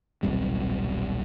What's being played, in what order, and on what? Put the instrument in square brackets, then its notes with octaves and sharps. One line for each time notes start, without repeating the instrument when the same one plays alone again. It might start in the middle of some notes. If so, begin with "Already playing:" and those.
[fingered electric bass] D#1 B1 C3 G3